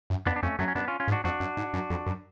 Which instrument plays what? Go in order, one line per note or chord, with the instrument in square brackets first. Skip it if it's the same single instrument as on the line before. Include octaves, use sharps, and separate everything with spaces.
[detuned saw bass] F#2
[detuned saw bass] F2 [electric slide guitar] B3 D4
[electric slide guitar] D4
[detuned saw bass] F2 [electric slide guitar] A3 C#4
[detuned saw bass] F#2 [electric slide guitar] F#3 A3
[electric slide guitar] C#4
[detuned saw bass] F#2 [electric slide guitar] B3 D4
[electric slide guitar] C#4 F4
C#4 F4
[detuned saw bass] G#2
[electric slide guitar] D4 F#4
[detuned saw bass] F2 [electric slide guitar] D4 F#4
[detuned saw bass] F#2
G#2
F#2
F2
F#2